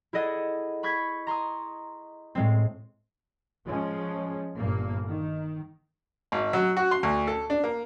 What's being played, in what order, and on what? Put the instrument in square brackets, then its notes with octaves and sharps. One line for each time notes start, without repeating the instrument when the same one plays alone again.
[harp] E4 G#4 A4 D#5 F#5
B5 C#6 G6 G#6 B6
A#5 C6 C#6 D#6
A2 G#3 C4
[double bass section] F3 G#3 C#4
G1 G2 A#2 A#3
D#3
[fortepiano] G#1
F#3
F#4
C6
D2
A4
D4
A#3